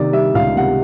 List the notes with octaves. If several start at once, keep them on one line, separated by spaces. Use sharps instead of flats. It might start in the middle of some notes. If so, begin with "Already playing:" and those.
Already playing: C3 D#3 D5
G3 E5
C#2 F5
C3 F#5